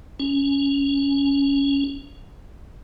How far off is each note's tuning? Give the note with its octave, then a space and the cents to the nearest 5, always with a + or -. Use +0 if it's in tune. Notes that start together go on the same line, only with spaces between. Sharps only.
C#4 +10